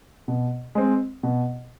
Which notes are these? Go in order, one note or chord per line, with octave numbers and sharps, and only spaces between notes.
B2
G#3 C4
B2